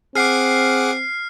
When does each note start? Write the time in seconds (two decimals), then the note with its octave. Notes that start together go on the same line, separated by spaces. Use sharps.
0.15 C4 G#4 F#5 D6 F6 C7